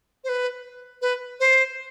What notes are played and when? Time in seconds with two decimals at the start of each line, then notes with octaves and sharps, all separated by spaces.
0.24 C5
0.29 B4
1.02 B4
1.40 C5